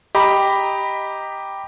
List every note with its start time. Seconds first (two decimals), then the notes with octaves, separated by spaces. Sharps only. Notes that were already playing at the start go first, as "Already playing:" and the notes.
0.15 G4 D#5 A#5 B5